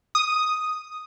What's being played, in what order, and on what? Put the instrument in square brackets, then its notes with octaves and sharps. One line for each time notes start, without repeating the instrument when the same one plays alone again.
[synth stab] D#6